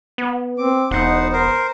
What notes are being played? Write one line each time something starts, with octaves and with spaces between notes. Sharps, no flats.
B3
C4 D6
E1 B3 D#4 C5 F#5
A#4 C5